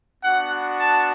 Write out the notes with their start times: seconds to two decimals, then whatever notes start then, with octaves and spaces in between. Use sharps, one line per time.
0.23 B3 D4 F#4 F#5
0.80 A5